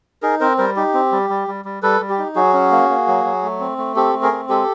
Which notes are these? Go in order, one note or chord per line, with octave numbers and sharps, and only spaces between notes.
D#4 G#4 A#4
C4 A#4 C5
G3 A#4 C5
D#4 G4
C4
G3
G3
G3
G3
G3 A4 B4
G3
G4
D#4
F#3 F#4 G#4
C#4
A#3
A#3
F#3
F#3
A3
C4
A3
C4 G4 A4
A3
G#4 A#4
C4
G#3 G4 A4